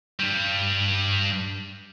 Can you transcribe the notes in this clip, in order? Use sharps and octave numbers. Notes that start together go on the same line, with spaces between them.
G2 G3